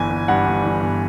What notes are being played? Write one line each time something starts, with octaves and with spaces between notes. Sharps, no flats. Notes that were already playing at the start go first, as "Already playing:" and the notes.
Already playing: G1 E3 G#5
G1
G2 F#5
G1
E3
G1